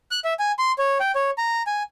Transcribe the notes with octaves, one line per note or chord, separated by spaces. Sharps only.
F#6
E5
G#5
C6
C#5
G5
C#5
A#5
G#5